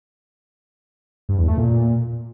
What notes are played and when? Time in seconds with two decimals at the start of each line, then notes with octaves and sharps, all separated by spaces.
1.29 G2
1.38 E2
1.48 A3
1.58 A#2